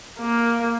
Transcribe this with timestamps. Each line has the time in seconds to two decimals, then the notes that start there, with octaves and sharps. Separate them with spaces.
0.20 A#3